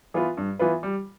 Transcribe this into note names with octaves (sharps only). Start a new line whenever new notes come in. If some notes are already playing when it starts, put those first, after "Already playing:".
E3 B3 F4 B4
G2
E3 B3 F4 B4
G3